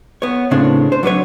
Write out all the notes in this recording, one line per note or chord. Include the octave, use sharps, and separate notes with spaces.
B3 C#5
A2 C#3 C4 D4
C5
F#3 D4 B4 C#5